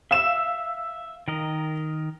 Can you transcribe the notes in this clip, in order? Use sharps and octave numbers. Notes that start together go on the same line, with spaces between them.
E5 F5 E6 E7
D#3 A#4 D#5